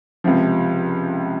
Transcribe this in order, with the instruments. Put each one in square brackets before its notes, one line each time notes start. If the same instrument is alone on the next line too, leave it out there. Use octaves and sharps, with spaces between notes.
[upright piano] C#2 C3 F3